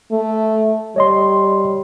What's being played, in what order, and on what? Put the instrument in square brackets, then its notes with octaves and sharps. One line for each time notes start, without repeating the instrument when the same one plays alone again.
[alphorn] A3
[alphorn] G3 [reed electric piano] C#5 D#5 C6